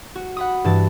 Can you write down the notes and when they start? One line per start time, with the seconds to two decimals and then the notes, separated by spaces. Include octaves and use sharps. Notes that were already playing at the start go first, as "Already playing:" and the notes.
0.15 F#4
0.37 F#5 B5 D#6
0.64 G2 E3 A5